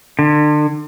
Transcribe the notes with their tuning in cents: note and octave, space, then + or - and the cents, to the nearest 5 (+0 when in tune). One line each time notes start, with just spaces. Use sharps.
D3 +35